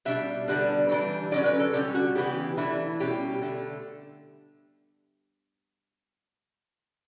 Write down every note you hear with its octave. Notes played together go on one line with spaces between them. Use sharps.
B2 G3 D4 E5
D3 G3 B3 D4
E3 G3 D4
D3 F#3 C#4 D5
B4
A4
D3 G3 C#4 G4
F#4
C#3 E3 B3 G4
E3 A3 D4 E4
B2 G3 C#4 G4
D3 A3